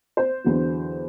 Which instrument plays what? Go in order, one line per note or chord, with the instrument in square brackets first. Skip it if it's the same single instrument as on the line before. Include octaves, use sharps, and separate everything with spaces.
[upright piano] C5
E2 D3 F#3